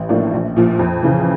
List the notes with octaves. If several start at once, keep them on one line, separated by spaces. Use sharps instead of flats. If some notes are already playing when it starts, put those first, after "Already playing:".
Already playing: A1
A2 F3 A#3 D4
A#1
A#2 F3
F2
C#3 E3